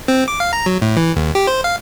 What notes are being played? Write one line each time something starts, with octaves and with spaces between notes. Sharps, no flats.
C4
D6
F5
A#5
F#3
A2
E3
D#2
G4
C5
F5